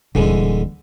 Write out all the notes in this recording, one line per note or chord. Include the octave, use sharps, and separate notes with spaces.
D#1 D3 E3 G#3